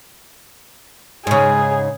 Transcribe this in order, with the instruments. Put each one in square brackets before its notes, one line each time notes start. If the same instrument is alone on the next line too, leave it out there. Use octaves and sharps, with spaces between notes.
[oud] G#2 C#3 [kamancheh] G#4